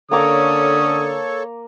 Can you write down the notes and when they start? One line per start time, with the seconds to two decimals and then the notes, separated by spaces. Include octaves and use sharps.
0.11 D3 A#3 C#4 A4 C#5 A#5 D6 D#6